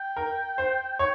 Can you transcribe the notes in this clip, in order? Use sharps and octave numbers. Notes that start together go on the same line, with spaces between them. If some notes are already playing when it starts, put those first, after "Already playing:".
Already playing: G5
A#4
C5
C#5